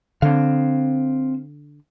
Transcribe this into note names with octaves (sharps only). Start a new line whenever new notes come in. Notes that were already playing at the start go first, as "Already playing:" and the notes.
D3 C4 F5